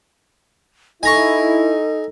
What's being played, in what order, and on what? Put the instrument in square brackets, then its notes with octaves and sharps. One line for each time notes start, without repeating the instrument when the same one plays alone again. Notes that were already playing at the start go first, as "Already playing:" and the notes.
[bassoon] D#4 [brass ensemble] E4 [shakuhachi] A4 [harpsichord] G#5 A#5 C#6